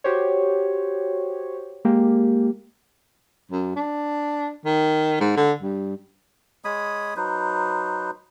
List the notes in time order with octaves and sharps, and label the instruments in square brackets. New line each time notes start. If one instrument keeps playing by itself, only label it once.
[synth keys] F#4 G4 C5 C#5
G#3 A#3 G4
[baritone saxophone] F#2
D4
D#3
G#2
D3
G2
[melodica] G#3 C#5 B5 D#6
F#3 D#4 B4 C5